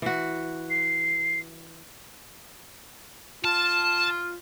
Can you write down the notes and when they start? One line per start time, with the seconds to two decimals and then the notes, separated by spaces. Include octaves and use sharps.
0.02 E3 F#4
0.70 C7
3.44 F4 A5